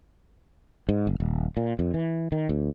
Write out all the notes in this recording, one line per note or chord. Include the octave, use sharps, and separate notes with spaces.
G#2
F#1
D#1
A#2
F2
E3
D#3
D2